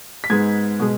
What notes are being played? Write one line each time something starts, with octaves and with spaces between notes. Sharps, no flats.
B6
G#2 G#3 B3 G#6
B2 G#3